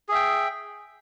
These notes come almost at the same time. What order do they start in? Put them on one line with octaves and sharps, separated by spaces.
G#4 E5 G5